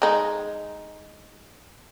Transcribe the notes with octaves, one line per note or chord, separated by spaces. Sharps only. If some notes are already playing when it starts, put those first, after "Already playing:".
G#3 D#4